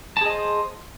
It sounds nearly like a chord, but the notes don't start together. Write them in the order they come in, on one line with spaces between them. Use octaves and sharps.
A5 G#4 D#5 C5